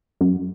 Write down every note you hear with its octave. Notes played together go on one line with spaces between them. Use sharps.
F#2